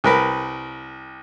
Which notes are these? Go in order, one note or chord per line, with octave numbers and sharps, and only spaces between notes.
C2 A#4 B4